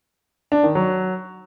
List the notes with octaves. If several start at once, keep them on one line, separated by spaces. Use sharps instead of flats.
D4
D#3
F#3